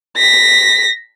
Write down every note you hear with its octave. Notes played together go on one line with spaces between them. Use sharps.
A#6 B6